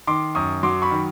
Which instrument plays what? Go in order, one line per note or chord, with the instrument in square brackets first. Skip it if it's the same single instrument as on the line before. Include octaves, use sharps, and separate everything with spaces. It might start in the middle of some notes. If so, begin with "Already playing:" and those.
[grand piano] D#3 C6 D6
F#2 C#6 D#6
F#3 C6 D6
B5 C#6
D#3